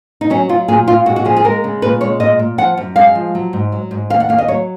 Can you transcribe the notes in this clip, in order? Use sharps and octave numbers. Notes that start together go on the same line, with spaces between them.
D#4
F#3 C#4
F#3 F4
A#2 G#4
A#2 F4
G#3 F#4
F#4
F3 G#4
G#4
G#3 A#4
C#3
A#2 B4
G#3 C#5
A#2 D#5
A#2
F3 F#5
F#2
G#3 F5
F3
F#3
G#2
F#3
G#2
D#2 F5
F#5
D#2 F5
D#5
F#3 C#5